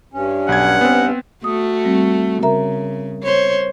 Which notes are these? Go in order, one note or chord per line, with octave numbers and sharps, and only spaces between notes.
G2 C#4
B1 F#5 G#6
B3 C4
A3 F#4 D#6
G3 C4
C#3 A#4 E5 A#5
C5 C#5